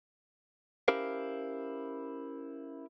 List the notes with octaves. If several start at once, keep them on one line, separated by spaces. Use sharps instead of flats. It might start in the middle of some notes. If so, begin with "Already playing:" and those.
C#4 E4 G4 A#4 C5 F5